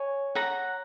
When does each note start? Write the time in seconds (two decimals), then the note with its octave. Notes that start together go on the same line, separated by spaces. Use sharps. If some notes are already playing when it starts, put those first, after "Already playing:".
Already playing: C#5 G#5
0.35 F#5 A#5